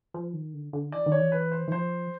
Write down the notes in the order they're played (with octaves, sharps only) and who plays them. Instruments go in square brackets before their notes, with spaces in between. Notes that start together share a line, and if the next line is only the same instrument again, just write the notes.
[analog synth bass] F3
D#3
D3
D3
[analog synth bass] E3 [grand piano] D5
[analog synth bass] D#3
[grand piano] C#5
[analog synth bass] E3
[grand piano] B4
C5
[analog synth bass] E3
[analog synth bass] F3 [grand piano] C5